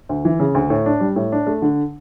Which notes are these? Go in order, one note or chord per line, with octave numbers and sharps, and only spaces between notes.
D2
E3
C#3
D2
A2
D4
G3
A2
D4
A3
D3